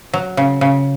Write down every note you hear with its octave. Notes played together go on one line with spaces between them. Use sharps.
F#3
C#3
C#3